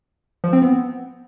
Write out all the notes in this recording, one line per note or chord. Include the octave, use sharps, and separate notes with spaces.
F3
C4
B3